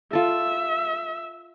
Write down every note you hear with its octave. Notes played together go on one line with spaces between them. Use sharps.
F4 A4 E5